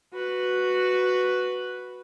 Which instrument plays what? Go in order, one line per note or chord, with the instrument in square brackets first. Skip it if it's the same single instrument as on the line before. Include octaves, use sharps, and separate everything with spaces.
[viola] F#4 B4